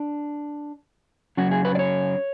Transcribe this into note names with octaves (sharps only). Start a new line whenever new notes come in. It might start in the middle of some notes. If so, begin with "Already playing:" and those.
Already playing: D4
F#2 C#3 F#3 C#4 F#4
G#4
B4
D5
C#5